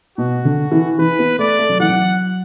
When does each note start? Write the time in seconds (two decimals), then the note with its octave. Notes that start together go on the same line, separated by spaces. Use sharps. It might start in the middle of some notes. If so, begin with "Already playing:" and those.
0.18 B2 F#4
0.45 D3
0.72 E3
0.98 E3 B4
1.19 B3
1.39 A3 D5
1.59 A3
1.69 F#3
1.80 E3 F#5
1.89 F#3